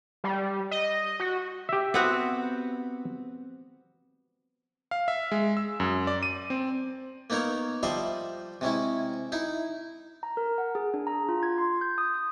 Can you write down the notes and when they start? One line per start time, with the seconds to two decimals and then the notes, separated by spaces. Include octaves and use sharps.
0.24 G3
0.71 D#5
1.20 F#4
1.69 G4 E5
1.94 B3 C4 F#4
4.91 F5
5.08 E5
5.32 G#3
5.57 E6
5.80 F#2
6.07 D5
6.23 D#7
6.50 C4
7.30 A#3 B3 D#4 A#4 C#5
7.83 F3 G3 D#5 E5 B5 C6
8.61 C3 G#3 C#4 E4
9.32 D#4 E4
10.23 A#5
10.37 A#4
10.58 F#5
10.75 G#4
10.94 D4
11.07 A#5
11.29 F4
11.43 G#6
11.58 C6
11.81 G6
11.98 D#6
12.14 D#6